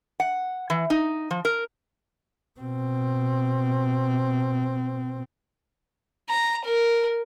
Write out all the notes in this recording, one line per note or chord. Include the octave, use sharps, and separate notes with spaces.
F#5
E3
D#4
F3
A#4
B2 C4
A#5
A#4